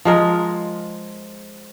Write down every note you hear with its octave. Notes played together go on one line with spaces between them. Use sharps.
F3 G#3 A#4